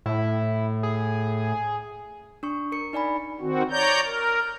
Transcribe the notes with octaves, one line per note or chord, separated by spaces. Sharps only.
A2 E4
G#4
D4 C#6
A#4 C#7
D#4 D5 G#5 B5
D#3 C4 F#4
C#5 D5 A#5 G6
A#4